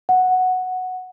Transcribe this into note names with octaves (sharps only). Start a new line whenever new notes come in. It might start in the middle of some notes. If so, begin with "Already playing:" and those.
F#5